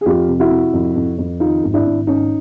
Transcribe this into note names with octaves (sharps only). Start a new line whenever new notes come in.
G#4
F2 F4 G4
C3
E4 F#4
C3
F2
F2
F2
D#3 D#4 F4
G#1
D4 E4
G#1
G#1 C#4 D#4